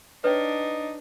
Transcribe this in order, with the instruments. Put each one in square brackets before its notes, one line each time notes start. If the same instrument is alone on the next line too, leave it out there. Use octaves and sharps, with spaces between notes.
[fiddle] D4 [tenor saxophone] D#4 [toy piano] B4 C#5 G5